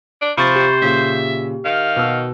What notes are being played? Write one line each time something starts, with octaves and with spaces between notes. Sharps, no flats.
D4
C3 F3 C5 B5 C#6 A6
G4
A#2 C#3 E5
D#3 F5
B2 F#4 E6